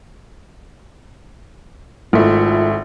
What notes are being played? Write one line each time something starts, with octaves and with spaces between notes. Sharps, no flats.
G#1 A3 E4 F4